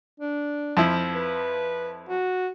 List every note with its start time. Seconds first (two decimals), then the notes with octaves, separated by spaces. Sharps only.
0.20 D4
0.77 F2 F3 E4
1.14 B4
2.09 F#4